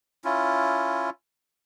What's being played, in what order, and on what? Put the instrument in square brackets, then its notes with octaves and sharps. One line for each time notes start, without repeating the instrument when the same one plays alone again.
[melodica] C#4 E4 F4